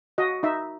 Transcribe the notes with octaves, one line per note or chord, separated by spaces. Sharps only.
F#4 D#5
D#4 E5